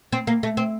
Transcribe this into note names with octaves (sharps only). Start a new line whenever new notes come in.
C4
A#3
A3
C4